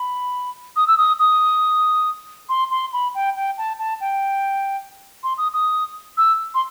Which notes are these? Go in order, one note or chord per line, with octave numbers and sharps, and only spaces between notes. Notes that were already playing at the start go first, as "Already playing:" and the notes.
Already playing: B5
D#6
E6
D#6
D#6
C6
C6
B5
G5
G5
A5
A5
G5
C6
D#6
D#6
E6
C6